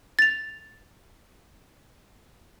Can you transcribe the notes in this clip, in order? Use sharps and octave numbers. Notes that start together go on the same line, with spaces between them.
A6 F7